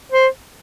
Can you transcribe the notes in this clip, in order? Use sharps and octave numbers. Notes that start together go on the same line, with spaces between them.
C5